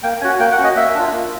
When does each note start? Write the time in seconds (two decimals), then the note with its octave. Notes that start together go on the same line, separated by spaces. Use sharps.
0.03 A#3 G5
0.21 C#4 F#4 G#5
0.40 A#3 G5
0.52 F#5
0.58 C#4 F#4
0.64 D#5
0.76 A#3 E5
0.95 D4 F4
1.12 A#3